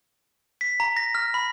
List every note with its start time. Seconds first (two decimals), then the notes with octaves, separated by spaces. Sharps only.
0.61 B6
0.80 A#5
0.97 A#6
1.15 F6
1.34 B5